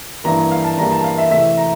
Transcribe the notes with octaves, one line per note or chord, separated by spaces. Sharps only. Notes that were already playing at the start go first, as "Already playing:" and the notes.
G2 E3 G3 A#3 A#5
F5
A5
G2 E3 G3 A#3 A#5
A5
F5
E5
C3 E3 A3 E5
A#5